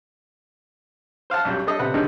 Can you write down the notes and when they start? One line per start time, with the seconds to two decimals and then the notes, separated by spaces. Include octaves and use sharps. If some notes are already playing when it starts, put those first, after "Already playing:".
1.30 C5 F5 F#5 A5
1.45 B1 F#2 F#3 G3
1.67 G3 D4 A4 D#5
1.79 C#2 C3 B4 F#5
1.94 D3 D#3 G3 G#3 B3 D#4